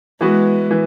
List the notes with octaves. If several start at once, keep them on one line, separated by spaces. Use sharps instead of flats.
E3 G#3 B3 F#4
E3